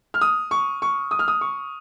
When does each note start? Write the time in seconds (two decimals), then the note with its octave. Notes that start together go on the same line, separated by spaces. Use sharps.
0.14 F6
0.21 D#6
0.51 C#6
0.82 C#6
1.11 D#6
1.19 F6
1.28 D#6
1.41 C#6